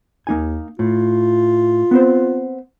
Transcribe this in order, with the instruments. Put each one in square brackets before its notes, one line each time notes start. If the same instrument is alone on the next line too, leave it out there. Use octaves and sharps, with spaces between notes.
[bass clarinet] D#2 [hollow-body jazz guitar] A#3 D#4 G#5
[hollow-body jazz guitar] A2 [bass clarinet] F4
[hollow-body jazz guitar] B3 C4 C5